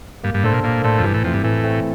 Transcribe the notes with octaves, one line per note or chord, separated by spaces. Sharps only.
G2 A#3
G2
A2 D4 A4 C5
A#2
A#2 A#3
A2 D4 A4 C5
F2
G2 E3
A2
F2 A3 C4
G2
A2 E3
A3 C4